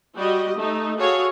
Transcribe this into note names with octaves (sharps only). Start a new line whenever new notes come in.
G3 F#4 G4 D#5
A3 D#4
F#4 G#4 A4 C#5 F5